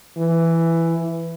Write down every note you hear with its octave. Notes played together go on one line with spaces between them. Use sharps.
E3